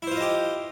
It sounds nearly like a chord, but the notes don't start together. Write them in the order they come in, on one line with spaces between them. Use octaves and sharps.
E4 C5 F4 D#5 G4